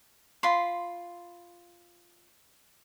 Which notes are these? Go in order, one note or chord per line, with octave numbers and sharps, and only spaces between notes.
F4 B5 C6